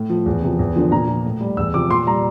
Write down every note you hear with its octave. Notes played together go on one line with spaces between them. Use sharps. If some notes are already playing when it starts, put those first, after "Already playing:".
Already playing: A2
F3
E2
C3 F3
E2
D3 F3
A#2 A#5
F3
A2
G3
E2 E6
C3 F3 D6
A#2 C6
G3 A#5